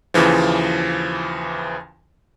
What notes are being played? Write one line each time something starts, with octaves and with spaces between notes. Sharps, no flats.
D#2 C#3 E3 F3